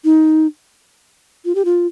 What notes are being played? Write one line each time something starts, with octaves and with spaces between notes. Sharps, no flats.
D#4
F4
G4
F4